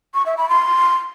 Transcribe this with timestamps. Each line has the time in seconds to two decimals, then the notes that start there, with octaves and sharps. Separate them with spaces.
0.14 C#6
0.26 E5
0.37 B5
0.49 C6